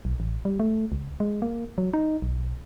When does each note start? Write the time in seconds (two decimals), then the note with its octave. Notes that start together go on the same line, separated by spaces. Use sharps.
0.05 B1
0.20 A1
0.45 G3
0.60 A3
0.92 C#2
1.20 G#3
1.42 A#3
1.78 F#3
1.93 D#4
2.22 B1